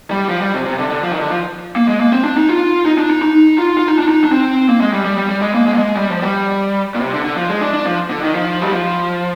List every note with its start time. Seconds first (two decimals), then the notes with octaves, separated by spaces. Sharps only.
0.11 G3
0.29 F3
0.41 G3
0.54 C3
0.66 C3
0.78 D3
0.90 D3
1.03 F3
1.12 D#3
1.20 D3
1.30 F3
1.76 A#3
1.88 G#3
2.00 A#3
2.12 C4
2.24 D4
2.37 D#4
2.49 F4
2.86 D#4
2.98 D4
3.10 D#4
3.22 D#4
3.58 F4
3.77 F4
3.88 D#4
3.99 D4
4.08 D#4
4.24 D4
4.32 C4
4.69 A#3
4.81 G#3
4.93 G3
5.05 G3
5.17 G3
5.29 G3
5.42 G#3
5.55 A#3
5.66 G#3
5.74 A#3
5.78 G#3
5.96 G3
6.10 F3
6.22 G3
6.94 A#2
7.00 C3
7.13 D3
7.25 D3
7.37 F3
7.50 G#3
7.61 D4
7.74 D4
7.86 F3
8.10 D3
8.22 D#3
8.35 F3
8.61 G3
8.71 F3